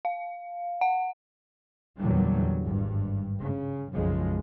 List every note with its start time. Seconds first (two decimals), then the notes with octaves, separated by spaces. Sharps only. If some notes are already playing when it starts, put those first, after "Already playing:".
0.05 F5
0.81 F#5
1.98 E2 A#2 D3 F#3 G3
2.63 G#1 G2
3.42 C#3
3.93 B1 F#2 C#3 F3 G#3